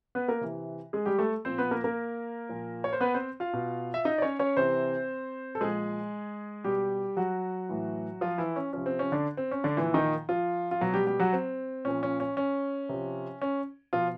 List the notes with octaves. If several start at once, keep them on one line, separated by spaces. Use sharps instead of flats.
B3 B4
A#3 A#4
C3 E3
G#3 G#4
G3 G4
A3 A4
A#2 F3 C4 C5
B3 B4
A#3 A#4
A#3 A#4
A#2 F3
C#5
C5
B3 B4
C4 C5
F4 F5
B2
E5
D#4 D#5
D5
C#4 C#5
C#4 C#5
C3 E3 C4 C5
A4
A#2 F3 G#3 G#4
B2 G3 G4
F#3 F#4
A2 E3
F3 F4
E3 E4
C#4
C3 F3 C#4
C4
C#4
D3 D4
C4
C#4
D3 D4
A#2 E3 F3 E4
D#3 D#4
F3 F4
F4
B2 F#3 F#4
G3 G4
G3 G4
F#3 F#4
C4
A#2 F3 C#4
C#4
C#4
C#4
C3 F3
C#4
B2 F3 F4